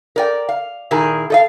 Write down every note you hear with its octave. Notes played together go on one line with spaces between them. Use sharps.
A#4 D5 G5
F5
A#2 D#3 E4 G#4 A#4
A4 D#5 F5